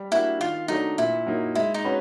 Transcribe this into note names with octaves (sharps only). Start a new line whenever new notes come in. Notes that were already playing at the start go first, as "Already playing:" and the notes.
Already playing: G3
A#3 D4 E4 F#4
D#3 F4
F#3 A3 D4 D#4
A#2 E4
F#3 A#3 D#4
G#3 E4
D#4
C#4 F#4 B4